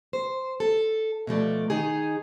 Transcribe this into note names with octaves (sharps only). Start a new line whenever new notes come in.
C5
A4
B2 F3 A3 D5
D#3 D#4 G#4